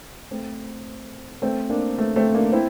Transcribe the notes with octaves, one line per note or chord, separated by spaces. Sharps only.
A3 C4
A3 C4
A#3 D4
A3
A3 C4
A#3 D4
C4 E4